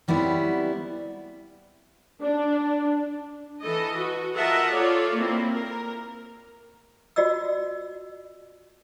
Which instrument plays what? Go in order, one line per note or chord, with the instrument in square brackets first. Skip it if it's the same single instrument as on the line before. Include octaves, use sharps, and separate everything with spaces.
[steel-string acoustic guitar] F#3 G3 B3 C4 E4
[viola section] D4
E3 A4 D#5
F#4
F4 A#4 D#5 E5 F#5 A5
F4 A4 C#5 D5
A#3 C4 E4
A#4
[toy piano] F4 F#4 D5 D#5 E6